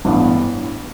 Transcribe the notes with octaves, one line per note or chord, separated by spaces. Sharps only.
A1 G2 E3 B3